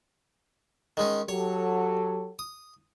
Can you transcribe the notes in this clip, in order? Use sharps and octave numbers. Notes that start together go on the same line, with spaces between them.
D#3 G#3 C#4
F#3 G4 A4 C#5
D#6